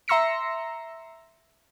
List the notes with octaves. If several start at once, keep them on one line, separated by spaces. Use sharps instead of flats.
E5 A#5 C6 E6 A#6 C#7